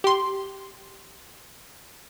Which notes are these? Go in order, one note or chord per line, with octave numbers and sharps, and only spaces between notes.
G4 C6